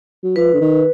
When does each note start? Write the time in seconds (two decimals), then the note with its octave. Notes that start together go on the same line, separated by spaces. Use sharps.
0.24 F#3
0.36 F3 B4
0.54 D3
0.61 D#3